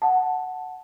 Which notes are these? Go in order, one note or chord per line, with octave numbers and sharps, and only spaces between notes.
F#5 A5